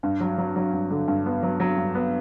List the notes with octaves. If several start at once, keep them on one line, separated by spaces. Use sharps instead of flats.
G2
F#3
F#3
F#3
G2
D3
G2
B3
F#3
F#3
G2
B3